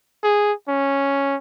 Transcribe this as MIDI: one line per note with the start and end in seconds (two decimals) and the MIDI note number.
0.23 0.53 68
0.69 1.36 61